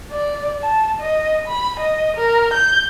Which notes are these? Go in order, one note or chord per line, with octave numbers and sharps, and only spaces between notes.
D5
A5
D#5
B5
D#5
A#4
G6